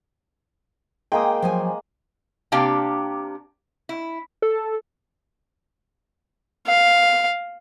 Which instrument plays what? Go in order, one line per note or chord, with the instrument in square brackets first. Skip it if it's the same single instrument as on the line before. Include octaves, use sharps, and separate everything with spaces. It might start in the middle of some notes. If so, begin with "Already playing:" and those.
[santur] G#3 A#3 D#6 [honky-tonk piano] G5
[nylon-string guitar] F3 F#3 G#5
[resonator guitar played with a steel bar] C3 A#3 D4 G4 F5 G5
E4
[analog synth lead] A4
[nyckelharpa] F5